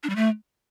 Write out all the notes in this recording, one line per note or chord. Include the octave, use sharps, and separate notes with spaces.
D4
G3
A3